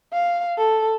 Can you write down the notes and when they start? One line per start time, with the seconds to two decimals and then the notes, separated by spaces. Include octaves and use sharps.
0.13 F5
0.58 A4